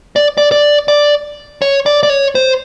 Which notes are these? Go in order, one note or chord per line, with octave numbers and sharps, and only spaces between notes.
D5
D5
D5
D5
C#5
D5
D5
C#5
C5